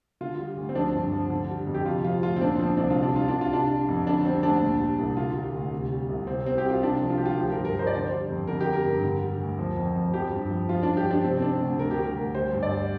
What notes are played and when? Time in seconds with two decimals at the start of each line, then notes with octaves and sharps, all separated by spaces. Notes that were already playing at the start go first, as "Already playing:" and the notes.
0.21 D3 F4
0.38 G3
0.57 D2
0.69 C4
0.75 F3 D4
0.93 G2
1.13 F3
1.30 D3
1.50 G3
1.67 F2
1.74 G4
1.86 C3 F4
2.04 F3 F4
2.23 D2 F4
2.36 C4
2.41 A#2 D4
2.59 F3 C4
2.77 C2 D4
2.90 F4
2.97 C3
3.03 D4
3.15 G3 F4
3.28 C2 D4
3.41 F4
3.51 C3 D4
3.70 G3
3.89 F2
4.07 D3 D4
4.25 G3 C4
4.43 D2 D4
4.61 A#2
4.80 G3
4.98 C2
5.17 D3 F4
5.35 G3
5.54 D2
5.73 C3
5.91 G3
6.09 C2
6.27 C3 C4
6.45 G3 C4
6.58 G4
6.64 C2
6.70 F4
6.83 C3 D4
7.01 F3
7.10 F4
7.18 D2 G4
7.26 F4
7.37 F3 G4
7.47 G4
7.51 A#4
7.57 G2
7.65 A#4
7.75 F3 C5
7.87 D5
7.93 D3 C5
8.12 G3
8.30 F2
8.47 D3 A#4
8.60 G4
8.67 G3
8.73 A#4
8.85 G2
9.03 D3
9.22 G3
9.40 D2
9.58 F3
9.77 F2
9.95 F3
10.14 F3 G4
10.32 G2
10.51 F3
10.69 F3 F4
10.83 G2 D4
10.97 G4
11.06 F3
11.11 D4
11.24 C3 C4
11.38 C4
11.42 G3 D4
11.61 D2
11.79 D3 A#4
11.91 G4
11.97 G3
12.03 A#4
12.16 D2
12.35 G3 C5
12.53 G2
12.63 D5
12.71 G3